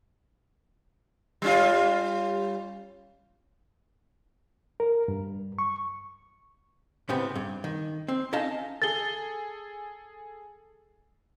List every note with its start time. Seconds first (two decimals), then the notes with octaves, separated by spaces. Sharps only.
1.42 G3 C#4 F4
4.80 A#4
5.08 G2
5.59 C#6
7.09 A2 C#3 B3 C4 G4
7.35 G2
7.64 D#3
8.08 C4
8.33 C#4 D#4 D#5 F5 A5
8.82 G#4 A4 A6 G7